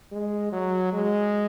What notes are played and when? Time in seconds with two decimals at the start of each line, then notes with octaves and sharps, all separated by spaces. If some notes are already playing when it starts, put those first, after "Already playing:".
0.12 G#3
0.52 F#3
0.93 G#3